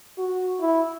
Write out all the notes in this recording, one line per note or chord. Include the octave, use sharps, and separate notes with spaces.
F#4
E4